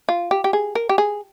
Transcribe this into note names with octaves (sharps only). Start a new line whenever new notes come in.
F4
G4
G4
G#4
A#4
G4
G#4